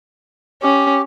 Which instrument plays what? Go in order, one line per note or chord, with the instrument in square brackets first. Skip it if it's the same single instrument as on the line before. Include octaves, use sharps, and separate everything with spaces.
[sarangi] C#4 [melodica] G4